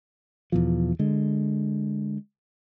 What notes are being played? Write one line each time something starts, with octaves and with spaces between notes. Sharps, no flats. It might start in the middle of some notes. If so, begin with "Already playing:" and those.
E2 B2 F3
D3 G#3